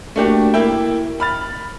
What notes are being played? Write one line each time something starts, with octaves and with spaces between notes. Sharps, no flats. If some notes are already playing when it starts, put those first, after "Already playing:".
A3 A#3 D4 F#4 G4
A#3 E4 E5 G5
B5 F6 A6